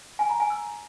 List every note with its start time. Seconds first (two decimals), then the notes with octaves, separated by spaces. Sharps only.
0.19 G#5
0.29 A#5
0.40 G#5
0.50 E6